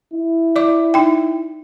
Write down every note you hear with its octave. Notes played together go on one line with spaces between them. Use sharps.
E4
D5 D6
D#4 G5